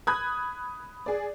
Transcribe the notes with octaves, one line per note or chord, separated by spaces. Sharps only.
B5 D#6 F#6 G#6
G#4 D5